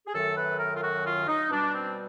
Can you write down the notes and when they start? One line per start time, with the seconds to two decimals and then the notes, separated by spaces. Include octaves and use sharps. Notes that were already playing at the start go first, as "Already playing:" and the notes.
0.07 G#4
0.13 F#2 D#3 F#3 A3 A4
0.36 B4
0.58 A#4
0.74 F4
0.82 F#4
1.04 F4
1.27 D#4
1.50 B2 G3 D4
1.73 C4